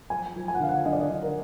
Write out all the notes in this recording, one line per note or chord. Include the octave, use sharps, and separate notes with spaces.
F3 G#5
F3
G#5
F#5
D3 F5
F#5
D3 D#5
D5
D#5
D3
A#4